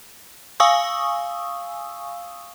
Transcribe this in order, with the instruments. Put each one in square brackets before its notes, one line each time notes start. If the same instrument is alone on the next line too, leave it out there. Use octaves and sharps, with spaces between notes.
[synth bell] F5 G#5 C#6 D#6 E6